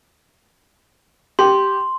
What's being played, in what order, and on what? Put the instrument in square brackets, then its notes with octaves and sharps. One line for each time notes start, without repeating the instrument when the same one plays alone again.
[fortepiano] G4 [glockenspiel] C6